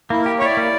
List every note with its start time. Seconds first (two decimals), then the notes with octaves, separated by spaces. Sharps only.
0.10 A#3 E4
0.21 G4 A#4
0.39 C#5
0.42 E4 D5
0.57 A#3